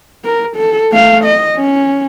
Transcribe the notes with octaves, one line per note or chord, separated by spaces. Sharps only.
A#4
A4
A3 F5
D#5
C#4